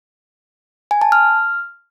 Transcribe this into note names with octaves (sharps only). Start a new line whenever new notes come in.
G#5
A5
F6